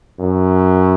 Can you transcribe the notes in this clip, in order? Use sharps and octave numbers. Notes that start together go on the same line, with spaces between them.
F#2